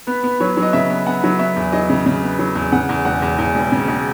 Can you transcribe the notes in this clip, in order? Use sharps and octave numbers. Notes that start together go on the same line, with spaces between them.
B3 B4
B3
F#3 C#5
F#3 D#5
C#3 E5
B3
B3 F#5
F#3
B3 E5
E2
F#3 D#5
C#3
C#3
B3
F#3
E2
C#3 F#5
E2
E1 F#5
E2
E2
E1
C#3
E1